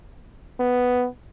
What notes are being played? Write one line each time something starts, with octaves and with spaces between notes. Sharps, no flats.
B3